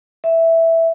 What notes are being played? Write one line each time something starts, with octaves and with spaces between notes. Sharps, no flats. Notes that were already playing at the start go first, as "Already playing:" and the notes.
E5